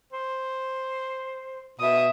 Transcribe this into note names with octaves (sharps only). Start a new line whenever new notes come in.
C5
B2 E5 D#6